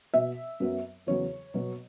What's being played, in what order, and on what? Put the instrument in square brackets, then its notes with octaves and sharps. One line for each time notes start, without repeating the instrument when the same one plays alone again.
[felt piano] B2 B3 E5
F#2 F#3 B3
E2 C#3 F#3 B3 C#5
B2 F#3 B3